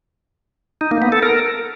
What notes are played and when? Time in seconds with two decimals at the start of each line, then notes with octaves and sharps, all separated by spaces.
0.81 D#4
0.91 A#3
1.02 B3
1.12 A4
1.23 A#4